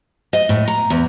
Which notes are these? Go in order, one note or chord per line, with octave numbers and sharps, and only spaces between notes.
D#5
A2
A#5
E2